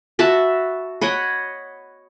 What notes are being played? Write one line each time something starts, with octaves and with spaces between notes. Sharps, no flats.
F#4 E5 A5 B5
C#5 D#5 F#5 B5